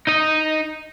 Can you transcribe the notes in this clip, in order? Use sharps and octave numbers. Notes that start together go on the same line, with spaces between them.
D#4 D#5